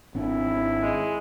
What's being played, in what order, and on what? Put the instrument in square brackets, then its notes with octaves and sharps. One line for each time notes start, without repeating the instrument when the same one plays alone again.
[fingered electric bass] G#1 C4 D4 [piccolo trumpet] E4
[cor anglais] G#3